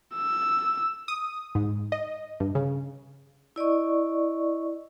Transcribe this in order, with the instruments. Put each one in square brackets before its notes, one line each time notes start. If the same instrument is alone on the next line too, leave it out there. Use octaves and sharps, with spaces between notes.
[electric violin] E6
[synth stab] D#6
G#2
D#5
G2
C#3
[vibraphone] E4 D5 D#5 C#6